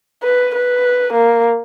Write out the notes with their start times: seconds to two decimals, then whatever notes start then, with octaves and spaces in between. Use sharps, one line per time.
0.23 B4
0.55 B4
1.13 A#3